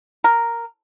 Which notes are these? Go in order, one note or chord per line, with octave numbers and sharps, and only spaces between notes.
A#4